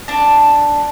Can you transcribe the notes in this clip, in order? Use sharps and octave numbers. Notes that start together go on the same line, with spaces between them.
D4 A5